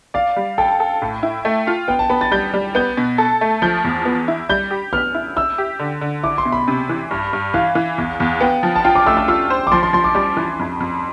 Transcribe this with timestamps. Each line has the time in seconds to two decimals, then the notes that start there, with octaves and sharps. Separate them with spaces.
0.14 D5 F5
0.36 G3
0.58 A4 G5
0.80 A4
1.02 A2
1.23 E4
1.45 A3
1.67 F4
1.88 B3 G5
1.99 A5
2.09 B3 B5
2.21 A6
2.31 G3 G6
2.54 G3
2.75 B3 G6
2.97 B2
3.18 A4
3.41 A3
3.62 F3 G6
3.84 E2
4.05 B3
4.28 E4
4.49 G3 G6
4.71 G4
4.93 B3 F6
5.14 E4
5.36 E4 E6
5.58 G4
5.79 D3
6.01 D3
6.23 E4 D6
6.38 C6
6.45 B2
6.52 B5
6.68 C3
6.89 E3
7.11 G2
7.33 G2
7.54 E3 F5
7.75 E3
7.98 E2
8.20 E2
8.41 B3 G5
8.63 F3
8.76 A5
8.84 F4 G5
8.95 D6
9.07 A3 E6
9.17 E6
9.28 F4 E6
9.50 C5
9.67 D6
9.71 F3 C6
9.83 C6
9.93 F3 C6
10.04 D6
10.15 G3 D6
10.37 E3
10.59 F2
10.80 F2